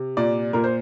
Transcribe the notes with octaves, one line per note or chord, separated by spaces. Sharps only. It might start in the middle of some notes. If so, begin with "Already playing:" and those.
Already playing: C3
A#2 D5
A#2 A#4
C5